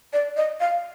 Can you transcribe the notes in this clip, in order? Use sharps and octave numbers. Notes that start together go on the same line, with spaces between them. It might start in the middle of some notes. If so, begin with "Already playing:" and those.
D5
D#5
F5